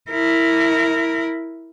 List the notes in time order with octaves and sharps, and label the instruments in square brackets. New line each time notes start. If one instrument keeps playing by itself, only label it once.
[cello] E4 A#4